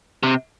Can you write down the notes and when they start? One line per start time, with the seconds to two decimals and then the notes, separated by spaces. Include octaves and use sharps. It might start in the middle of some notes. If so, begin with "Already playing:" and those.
0.23 C3